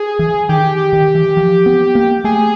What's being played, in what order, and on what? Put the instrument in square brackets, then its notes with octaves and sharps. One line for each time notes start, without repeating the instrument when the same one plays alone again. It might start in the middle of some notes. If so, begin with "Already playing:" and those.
Already playing: [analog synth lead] G#4
[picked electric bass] E3
[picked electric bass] D#3 [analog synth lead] G4
[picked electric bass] D#3
E3
F3
B3
A#3
[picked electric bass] A3 [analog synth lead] G#4